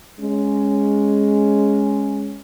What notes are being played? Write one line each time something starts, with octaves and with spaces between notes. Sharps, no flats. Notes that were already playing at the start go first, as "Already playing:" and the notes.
G#3 C#4